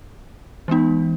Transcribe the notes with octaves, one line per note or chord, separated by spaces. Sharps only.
E3 G#3 B3 D#4